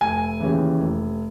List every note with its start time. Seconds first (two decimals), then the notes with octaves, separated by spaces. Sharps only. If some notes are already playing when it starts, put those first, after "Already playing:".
0.01 F1 G#5
0.40 D#2 C#3 E3
0.79 F1